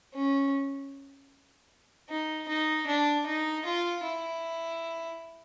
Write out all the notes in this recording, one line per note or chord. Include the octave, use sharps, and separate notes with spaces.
C#4
D#4
D#4
D4
D#4
F4
E4